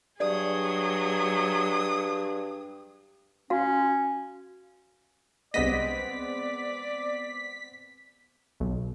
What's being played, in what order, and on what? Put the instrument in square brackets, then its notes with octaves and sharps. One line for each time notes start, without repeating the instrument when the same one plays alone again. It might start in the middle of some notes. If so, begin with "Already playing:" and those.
[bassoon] G2 [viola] F#3 G#4 [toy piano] D5 [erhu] D#6
[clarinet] C#4 [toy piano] F#4 F5
[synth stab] C2 D#5 [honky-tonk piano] G#3 B3 C4 [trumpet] D5 [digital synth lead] B6
[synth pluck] B1